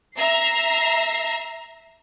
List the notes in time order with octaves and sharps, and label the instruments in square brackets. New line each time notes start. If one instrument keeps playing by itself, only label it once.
[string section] E5 A#5 C7